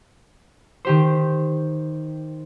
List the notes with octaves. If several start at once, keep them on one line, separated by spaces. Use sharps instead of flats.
D#3 G4 C5